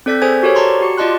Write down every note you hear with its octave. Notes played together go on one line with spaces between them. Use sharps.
C4 A4 D5 G6 B6
G#4 A4 C5 G#5 G#6
F#4 G4 A4 A#4 C5 C#5
D5 A5 A#5 C6 C#6
F#4 G4 C#7
F4 D5 D#5 A5 C6 F#6